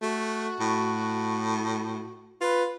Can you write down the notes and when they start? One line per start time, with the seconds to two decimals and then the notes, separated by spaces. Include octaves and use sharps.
0.02 A3 F#4
0.60 A2
2.41 F4 B4